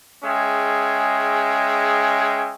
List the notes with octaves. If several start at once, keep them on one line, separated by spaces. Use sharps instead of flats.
G#3 C#4 G#4 E5 G5